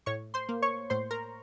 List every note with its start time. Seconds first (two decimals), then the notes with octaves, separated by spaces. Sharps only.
0.06 A2 C#5 C#6
0.34 C5 C6
0.49 A#3
0.62 C#5 C#6
0.90 A2 C5 C6
1.11 A#4 A#5